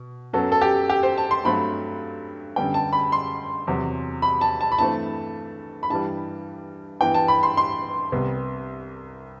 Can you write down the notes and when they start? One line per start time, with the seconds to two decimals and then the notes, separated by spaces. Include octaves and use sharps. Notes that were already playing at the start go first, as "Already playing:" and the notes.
Already playing: B2
0.33 F#2 F#3 B3 A4
0.52 A4
0.62 G4
0.89 G4
1.03 C5
1.18 A5
1.31 C6
1.45 G2 F#3 A3 C4 B5
2.56 F#2 D3 G3 B3 G5
2.74 A5
2.93 B5
3.12 C6
3.67 E2 C3 F#3
4.22 B5
4.41 A5
4.61 A5
4.72 B5
4.79 G2 E3 A3 C4 A5
5.83 B5
5.90 G2 E3 G3 A5
7.01 G2 E3 B3 G5
7.14 A5
7.28 B5
7.43 C6
7.57 C6
8.12 C2 C3 G3 B3